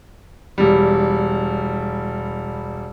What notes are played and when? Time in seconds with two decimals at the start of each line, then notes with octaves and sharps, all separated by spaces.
0.58 E1 G3